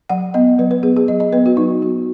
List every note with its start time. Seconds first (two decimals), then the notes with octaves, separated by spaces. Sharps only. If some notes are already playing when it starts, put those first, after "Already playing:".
0.10 F#3 F#5
0.34 B3 D#5
0.58 F#3 B4
0.71 B4
0.83 B3 G#4
0.96 G#4
1.08 F#3 D#5
1.20 D#5
1.33 B3 B4
1.46 F#4
1.57 F#3 D#4
1.82 B3 F#4